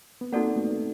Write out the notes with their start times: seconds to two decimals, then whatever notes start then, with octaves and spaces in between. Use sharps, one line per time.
0.21 B3
0.32 A#3 C4 D#4 F#4 A4 D5 F#5
0.56 A3 B3